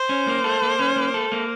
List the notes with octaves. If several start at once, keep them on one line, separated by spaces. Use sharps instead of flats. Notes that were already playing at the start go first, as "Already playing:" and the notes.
Already playing: C5
C#4
A#3
A4
A#3
C#4
A#3
A4
A#3